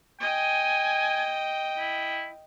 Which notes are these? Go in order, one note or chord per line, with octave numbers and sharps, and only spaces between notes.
D#5 G5 G#5
E4